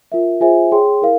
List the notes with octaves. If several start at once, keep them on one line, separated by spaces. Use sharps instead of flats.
F4 A#4 E5
F4 G#4 C5 E5 G#5
G#4 C#5 G5 C6
E4 A#4 F5